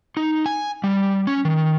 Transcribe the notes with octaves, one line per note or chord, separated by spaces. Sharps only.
D#4
G#5
G3
C#4
D#3